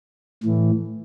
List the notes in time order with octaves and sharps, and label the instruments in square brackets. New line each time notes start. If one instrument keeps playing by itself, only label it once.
[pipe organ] A2 E3